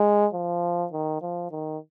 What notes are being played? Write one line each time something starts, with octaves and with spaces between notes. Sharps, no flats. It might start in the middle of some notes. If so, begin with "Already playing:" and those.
Already playing: G#3
F3
D#3
F3
D#3